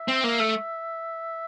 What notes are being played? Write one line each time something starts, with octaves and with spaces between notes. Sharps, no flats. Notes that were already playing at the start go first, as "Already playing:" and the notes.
Already playing: E5
C4
A#3
A3